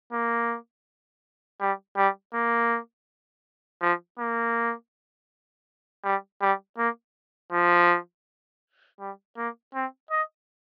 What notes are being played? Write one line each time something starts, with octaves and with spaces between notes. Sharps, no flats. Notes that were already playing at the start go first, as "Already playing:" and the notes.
A#3
G3
G3
A#3
F3
A#3
G3
G3
A#3
F3
G3
A#3
C4
D#5